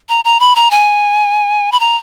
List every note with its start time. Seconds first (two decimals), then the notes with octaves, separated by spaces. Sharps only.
0.09 A#5
0.25 A#5
0.40 B5
0.56 A#5
0.71 G#5
1.72 B5
1.80 A#5